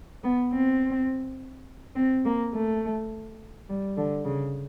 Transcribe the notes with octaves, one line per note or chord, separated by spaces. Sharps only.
B3
C4
C4
A#3
A3
G3
D3
C#3